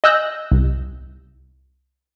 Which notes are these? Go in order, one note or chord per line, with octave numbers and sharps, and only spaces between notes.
D#5 G#5 E6 F#6 G6 A#6
C2